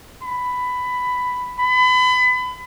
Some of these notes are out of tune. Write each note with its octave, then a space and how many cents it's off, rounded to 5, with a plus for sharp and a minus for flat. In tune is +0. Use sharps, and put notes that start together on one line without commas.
B5 +10
B5 +30